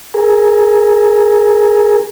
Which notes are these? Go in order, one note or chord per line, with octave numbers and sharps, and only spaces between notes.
G#4 A#4